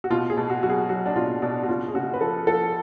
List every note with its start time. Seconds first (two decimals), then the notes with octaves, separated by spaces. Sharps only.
0.04 F#4
0.10 B2 F4
0.30 G#4
0.37 B2
0.50 F#4
0.63 F#3 F#4
0.70 G#4
0.89 F#3 F#4
1.06 D4
1.16 B2 F4
1.42 B2 D4
1.63 F#4
1.69 C#3 F4
1.88 G#4
1.95 C#3 F#4
2.14 B4
2.21 F3 A4
2.47 F3 A4